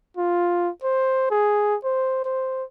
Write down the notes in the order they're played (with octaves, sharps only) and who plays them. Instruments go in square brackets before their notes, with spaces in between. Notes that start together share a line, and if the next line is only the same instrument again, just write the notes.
[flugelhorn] F4
C5
G#4
C5
C5